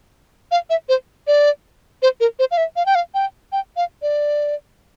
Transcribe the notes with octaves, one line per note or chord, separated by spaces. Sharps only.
F5
E5
C5
D5
C5
A#4
C5
F5
E5
F5
G5
F5
G5
G5
F5
D5